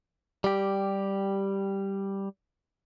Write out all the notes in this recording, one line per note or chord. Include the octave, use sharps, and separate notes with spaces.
G3 G4